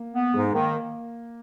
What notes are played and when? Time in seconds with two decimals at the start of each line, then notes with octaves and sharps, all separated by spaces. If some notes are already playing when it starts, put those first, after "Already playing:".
Already playing: A#3
0.14 B3
0.33 G#2 G#3
0.53 D#3 A#3